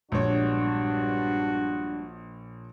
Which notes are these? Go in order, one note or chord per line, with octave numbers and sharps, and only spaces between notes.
A#1 G2 G#3 B3 D4 F#4 C#5